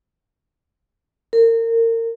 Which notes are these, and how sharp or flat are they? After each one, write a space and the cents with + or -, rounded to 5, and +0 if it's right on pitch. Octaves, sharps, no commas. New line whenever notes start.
A#4 -30